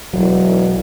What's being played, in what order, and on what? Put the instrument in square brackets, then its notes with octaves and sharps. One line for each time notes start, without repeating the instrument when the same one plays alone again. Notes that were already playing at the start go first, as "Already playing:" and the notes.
[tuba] E1 [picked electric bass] B1 F#3